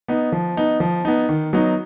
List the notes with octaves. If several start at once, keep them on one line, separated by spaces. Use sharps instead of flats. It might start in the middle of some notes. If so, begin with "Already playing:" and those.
B3 D#4
F3
B3 D#4
F3
B3 D#4
D#3
F#3 B3 D#4